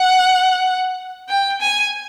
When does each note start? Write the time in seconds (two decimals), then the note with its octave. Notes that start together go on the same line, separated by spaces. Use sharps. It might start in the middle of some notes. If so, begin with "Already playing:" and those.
Already playing: F#5
1.30 G5
1.61 G#5